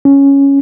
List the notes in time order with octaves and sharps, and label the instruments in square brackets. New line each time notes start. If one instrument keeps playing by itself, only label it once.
[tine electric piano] C#4